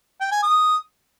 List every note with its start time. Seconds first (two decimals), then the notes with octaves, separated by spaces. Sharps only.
0.21 G5
0.32 G#5
0.43 D#6